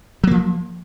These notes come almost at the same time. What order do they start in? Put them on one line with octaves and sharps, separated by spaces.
F#3 A#3 F3